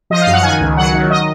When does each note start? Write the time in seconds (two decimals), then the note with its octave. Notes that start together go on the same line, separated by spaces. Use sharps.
0.10 F3 D#5
0.21 F5
0.27 F#2
0.33 F#5
0.43 D#3 G#5
0.60 C#2
0.77 F#3 F#5
0.93 D#3
1.10 D#5